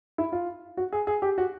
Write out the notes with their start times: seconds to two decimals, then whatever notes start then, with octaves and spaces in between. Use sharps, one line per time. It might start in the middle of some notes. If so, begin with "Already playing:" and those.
0.18 E4
0.32 F4
0.77 F#4
0.92 G#4
1.07 G#4
1.22 G4
1.38 F#4